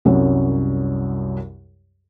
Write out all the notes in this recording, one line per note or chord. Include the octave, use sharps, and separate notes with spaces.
C2 F#2 F#3 G3